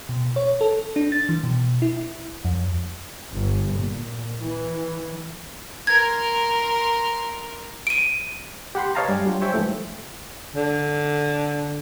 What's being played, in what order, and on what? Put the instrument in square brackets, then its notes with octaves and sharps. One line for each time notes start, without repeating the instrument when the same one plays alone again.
[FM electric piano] B2
C#5
A4
D4
A6
E3
B2
E4
F2
[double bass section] G1
A#2
E3
[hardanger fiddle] A#4 C6 [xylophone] G#6
[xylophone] D7 D#7
[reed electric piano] G4 F#5 B5 C6
B4 C#5 D#5 F5 A5 A#5
G2 G3 D5 G#5
F#3 G3 D4 F4
C5 C#5 E5 G5 G#5
G#2 E3 F3 G3 A3
[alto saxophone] D3